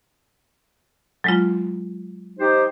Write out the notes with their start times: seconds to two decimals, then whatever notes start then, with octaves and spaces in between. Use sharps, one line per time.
1.24 F#3 G#3 F4
2.40 D#4 G4 C5